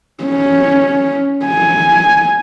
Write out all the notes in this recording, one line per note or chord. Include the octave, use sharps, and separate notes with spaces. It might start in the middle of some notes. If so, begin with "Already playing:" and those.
C#4
G#5